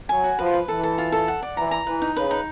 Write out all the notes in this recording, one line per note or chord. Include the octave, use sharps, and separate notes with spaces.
F#3 G#5
F#4
F3 B4
B4
E3 A4
A4
F4
A4
F#5
D5
E3 A#5
A#5
E3 B4
D#4
C#3 B4
D#4